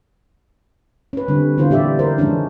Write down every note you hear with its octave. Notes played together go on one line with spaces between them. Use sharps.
C#4 B4
D3 G3 C4
D3 E3 B3 F4 C5
A#2 G3 G4 D5 E5
A#4 C5
D#3 F3 G#3 C#4 D4